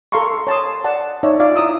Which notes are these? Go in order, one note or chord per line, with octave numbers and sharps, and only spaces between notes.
A4 A#4 F5 A#5 C6 C#6
C#5 A5 C6 D#6
D5 F#5 A5
D#4 C#5 D5 E5 A5
F4 D5 F5
E4 A#5 D#6 E6